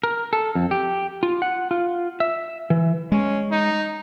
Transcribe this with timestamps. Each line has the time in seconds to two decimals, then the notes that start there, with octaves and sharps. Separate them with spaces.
0.03 A#4
0.33 A4
0.55 F2
0.71 G4
1.23 F4
1.42 F#5
1.71 F4
2.20 E5
2.70 E3
3.12 G#3 C#4
3.52 D#4